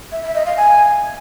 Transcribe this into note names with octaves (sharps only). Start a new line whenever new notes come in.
E5
E5
D#5
F5
G#5